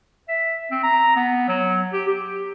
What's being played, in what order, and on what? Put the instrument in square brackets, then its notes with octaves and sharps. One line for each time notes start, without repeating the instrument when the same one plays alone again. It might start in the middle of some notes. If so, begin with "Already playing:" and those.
[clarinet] E5
C4
A#5
B3
F#3
G4
G4